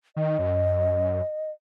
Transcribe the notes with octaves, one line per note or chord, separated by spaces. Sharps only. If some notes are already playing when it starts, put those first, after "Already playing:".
D#3 D#5
F#2